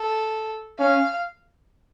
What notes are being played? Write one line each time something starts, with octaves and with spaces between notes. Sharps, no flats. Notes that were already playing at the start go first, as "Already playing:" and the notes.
Already playing: A4
C#4 F5